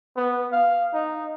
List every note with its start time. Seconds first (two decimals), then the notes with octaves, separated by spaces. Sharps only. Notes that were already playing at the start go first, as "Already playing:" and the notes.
0.17 B3
0.53 F5
0.94 D#4